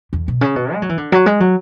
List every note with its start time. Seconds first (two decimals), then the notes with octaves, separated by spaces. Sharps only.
0.13 E2
0.28 B2
0.41 C#3
0.56 B2
0.73 G#3
0.82 F#3
0.89 E3
0.97 D3
1.12 F#3
1.26 G#3
1.40 F#3